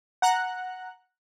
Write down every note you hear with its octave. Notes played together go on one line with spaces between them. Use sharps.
F#5 A#5 F#6